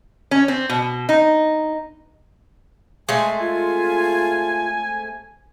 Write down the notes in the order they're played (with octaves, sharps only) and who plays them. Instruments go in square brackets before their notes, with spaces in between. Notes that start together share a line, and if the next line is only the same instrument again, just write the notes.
[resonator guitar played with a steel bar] C#4
C4
B2
D#4
[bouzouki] G#3 A3 C4 [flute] G#5
[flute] F4 [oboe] G#5